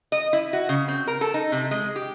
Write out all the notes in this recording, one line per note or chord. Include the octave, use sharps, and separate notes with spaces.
D#5
E4
F#4
C#3
C4
A#4
A4
D#4
C3
G#3
G4